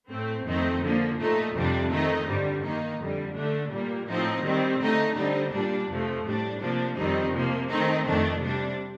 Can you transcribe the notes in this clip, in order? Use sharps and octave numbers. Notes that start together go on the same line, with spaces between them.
A2 A3 C4
F2 D#3 A3 C4 D#4
D3 F3 A#3
A#2 A3 D#4
F2 C3 G3 D4
D#3 A3 C4 D#4
G2 D3 G3
D#3 A#3 D#4
F2 D3 G3
D3 A3 D4
A#2 G3 A#3
A2 F3 C4 D#4
D#3 G3 C4
D3 A3 D#4
D3 G3 C4 D#4
A#2 G3 A#3 D4
F2 C3 F3 A3
A2 G3 D4
C3 F3 A#3 D4
F2 D#3 G3 C4 D#4
C3 F3 A#3
D#3 A3 C4 D#4
F2 D#3 A3 D4
C3 G3 D4